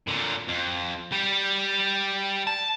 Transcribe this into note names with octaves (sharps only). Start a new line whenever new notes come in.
A#2 D3
F2
G3 G4
A5